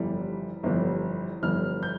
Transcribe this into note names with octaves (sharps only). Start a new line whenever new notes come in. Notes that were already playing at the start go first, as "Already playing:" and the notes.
Already playing: G1 F2 E3 G3
G1 F2 E3 G3
G1 F2 E3 G3 F6
G6